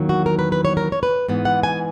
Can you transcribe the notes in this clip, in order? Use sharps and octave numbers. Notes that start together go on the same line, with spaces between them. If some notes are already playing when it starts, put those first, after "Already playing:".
Already playing: E2 D#3 F#3 A#3
F#4
A#4
B4
B4
C#5
A#4
C#5
B4
G#2 E3 B3
F#5
G#5